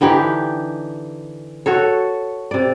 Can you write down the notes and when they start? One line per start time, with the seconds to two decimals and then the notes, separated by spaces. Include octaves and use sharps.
0.01 D3 E3 D#4 G4
1.66 F#4 A4 C#5
2.51 C3 D5